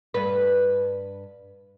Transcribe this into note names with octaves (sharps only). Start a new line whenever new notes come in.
G2 B4